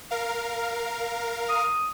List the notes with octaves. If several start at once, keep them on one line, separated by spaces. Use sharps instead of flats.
A#4 F5
D#6